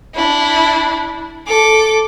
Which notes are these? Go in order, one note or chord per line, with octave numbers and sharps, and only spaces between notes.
D4 E4
A4 D6